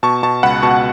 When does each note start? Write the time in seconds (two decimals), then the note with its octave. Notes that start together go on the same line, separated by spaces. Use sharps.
0.03 B2 A5 C#6
0.23 B2 A5 C#6
0.43 C#2 F#5 B5
0.62 B2 A5 C#6